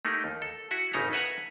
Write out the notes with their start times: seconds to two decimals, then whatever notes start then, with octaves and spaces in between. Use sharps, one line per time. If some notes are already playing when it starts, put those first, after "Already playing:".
0.05 A3 A#3 D#4 G4
0.24 D#2
0.42 A4
0.71 E4 F#4 E5
0.93 G#1 C#3 D#4 E4 A4 A#5
1.12 A4 B4 E5 F#5 G#5 A#5